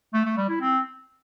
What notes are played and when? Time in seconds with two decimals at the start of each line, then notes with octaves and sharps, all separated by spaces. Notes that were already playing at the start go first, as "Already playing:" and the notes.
0.14 A3
0.26 A3
0.37 G3
0.49 E4
0.61 C4